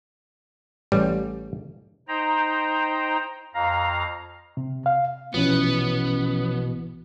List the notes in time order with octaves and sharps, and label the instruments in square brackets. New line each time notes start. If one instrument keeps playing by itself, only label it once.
[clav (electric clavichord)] A1 G3
[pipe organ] D#4 C5 G5 A#5
F2 F5 A#5
[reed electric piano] C3
F5
[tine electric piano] A#1 E3 [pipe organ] B2 [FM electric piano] F3 C#4 [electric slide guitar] B3